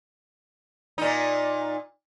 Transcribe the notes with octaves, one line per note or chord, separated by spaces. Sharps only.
A#2 D#4